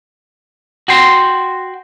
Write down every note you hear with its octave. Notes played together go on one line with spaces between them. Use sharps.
F#4 G5 C6